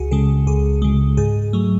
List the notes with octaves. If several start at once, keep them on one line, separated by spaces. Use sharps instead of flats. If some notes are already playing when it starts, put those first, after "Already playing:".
Already playing: C#2 F#4 G#4
C#3 G#3 A4
C#2 G#4
C#3 G#3
G#2 G#4
F#3 A3